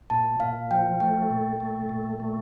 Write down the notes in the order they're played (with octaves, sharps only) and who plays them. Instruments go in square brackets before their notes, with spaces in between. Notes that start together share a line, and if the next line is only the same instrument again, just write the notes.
[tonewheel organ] A#2 [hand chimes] A5
[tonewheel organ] A#2 [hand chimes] F5
[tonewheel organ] F3 [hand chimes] G5
[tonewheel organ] A3 [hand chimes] G5
[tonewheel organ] A#2
A3
A#2
A3